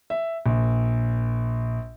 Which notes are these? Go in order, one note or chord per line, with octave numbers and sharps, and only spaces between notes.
E5
A#1